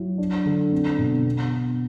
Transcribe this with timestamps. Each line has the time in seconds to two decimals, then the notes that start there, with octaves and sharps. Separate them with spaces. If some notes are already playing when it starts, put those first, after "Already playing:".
Already playing: F#3 E4
0.18 D4
0.45 D3
0.72 C4
0.98 B2
1.25 B3